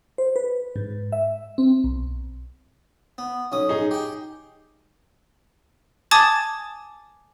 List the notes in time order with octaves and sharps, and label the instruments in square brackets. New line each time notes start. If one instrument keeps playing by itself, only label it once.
[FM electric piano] C5
B4
G#2
E5
C4
B1
[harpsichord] B3
B1 C#4 D#6
[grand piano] D#4 G#4
[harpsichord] G4 G5
[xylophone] G#5 A5 D6 D#6 G#6 A6